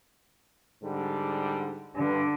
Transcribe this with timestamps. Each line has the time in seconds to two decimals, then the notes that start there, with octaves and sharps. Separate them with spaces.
0.83 G#2 D3 G3
1.96 G2 D3